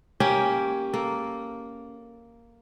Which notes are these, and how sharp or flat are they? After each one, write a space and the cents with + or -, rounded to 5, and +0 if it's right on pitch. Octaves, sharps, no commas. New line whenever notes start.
A#3 +0 C#4 +0 G4 +5
A#3 +0 A4 +0